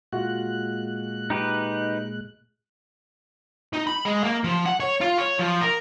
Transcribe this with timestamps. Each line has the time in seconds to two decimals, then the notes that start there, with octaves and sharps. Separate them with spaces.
0.13 A#2 G#3 F4 F#4 F#6
1.30 D#4 G4 B4
3.73 D#4
3.87 B5
4.05 G#3
4.24 A#3
4.44 F3
4.65 F#5
4.80 C#5
5.01 F4
5.18 C#5
5.39 F3
5.61 A#4